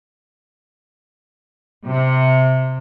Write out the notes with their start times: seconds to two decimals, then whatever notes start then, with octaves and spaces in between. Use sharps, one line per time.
1.84 C3